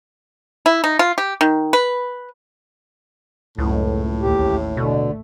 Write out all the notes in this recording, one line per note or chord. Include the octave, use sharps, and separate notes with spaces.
E4
D#4
F4
G4
D#3
B4
F#1 C#2 A2
A1 D#2 G4
B2 D3 A3